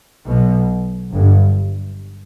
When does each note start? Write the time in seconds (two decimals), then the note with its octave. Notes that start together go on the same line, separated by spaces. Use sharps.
0.25 B1 B2
1.13 G1 G2